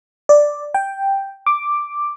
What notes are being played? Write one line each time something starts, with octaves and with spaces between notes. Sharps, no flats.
D5
G5
D6